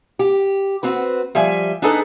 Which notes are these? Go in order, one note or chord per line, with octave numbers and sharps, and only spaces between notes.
G4
C4 F#4 B4
F3 G3 E5 G#5
D4 D#4 G#4 A4 B4